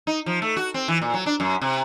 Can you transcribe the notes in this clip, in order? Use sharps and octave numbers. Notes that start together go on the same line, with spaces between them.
D#4
F3
A3
F#4
C4
E3
A#2
F#3
D4
F#2
C3